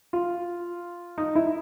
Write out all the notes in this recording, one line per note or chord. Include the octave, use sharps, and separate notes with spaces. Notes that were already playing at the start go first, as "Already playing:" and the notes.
F4
D#4
E4